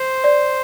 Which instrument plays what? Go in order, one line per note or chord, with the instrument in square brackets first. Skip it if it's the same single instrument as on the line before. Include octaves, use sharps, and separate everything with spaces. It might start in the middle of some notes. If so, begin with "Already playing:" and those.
Already playing: [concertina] C5 [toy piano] C6
[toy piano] D5